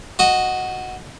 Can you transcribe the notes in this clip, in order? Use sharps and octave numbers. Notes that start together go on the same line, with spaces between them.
F#4 D#5